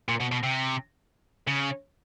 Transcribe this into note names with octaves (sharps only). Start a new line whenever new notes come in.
A#2
B2
B2
C3
C#3